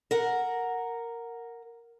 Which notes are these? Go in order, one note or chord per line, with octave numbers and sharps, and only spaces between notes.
A#4 F#5